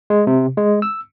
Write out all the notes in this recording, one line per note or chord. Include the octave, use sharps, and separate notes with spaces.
G#3
C3
G#3
E6